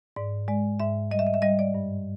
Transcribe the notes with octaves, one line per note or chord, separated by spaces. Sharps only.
G#2 D5
G#3 D5
G#2 E5
G3 D#5
E5
D#5
E5
G3 D#5
D5
G2